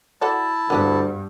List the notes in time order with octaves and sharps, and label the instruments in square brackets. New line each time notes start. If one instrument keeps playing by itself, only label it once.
[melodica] E4 A5 [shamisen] F#4 A4 D5
[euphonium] D2 [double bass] G2 [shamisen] B3 G4 F#5